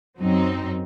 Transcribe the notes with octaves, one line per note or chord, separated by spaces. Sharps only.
F#2 F#3 C4 D#4